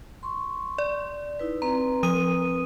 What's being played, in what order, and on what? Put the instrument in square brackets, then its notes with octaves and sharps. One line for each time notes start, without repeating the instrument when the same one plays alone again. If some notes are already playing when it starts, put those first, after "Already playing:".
[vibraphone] C6 C#6
[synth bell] D5
[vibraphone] D#4 E4 B4
[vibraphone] C4 B4 [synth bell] A#5
[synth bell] F3 D#6 D#7